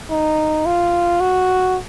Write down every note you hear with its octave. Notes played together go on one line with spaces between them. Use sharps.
D#4
F4
F#4